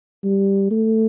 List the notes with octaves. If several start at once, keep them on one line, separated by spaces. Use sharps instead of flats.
G3
A3